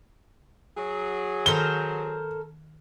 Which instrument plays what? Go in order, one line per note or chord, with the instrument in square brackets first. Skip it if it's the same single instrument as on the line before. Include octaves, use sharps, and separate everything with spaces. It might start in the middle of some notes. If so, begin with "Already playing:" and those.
[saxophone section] F#3 G#4
[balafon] D#3 [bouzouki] A4 A#4 C5 [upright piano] G7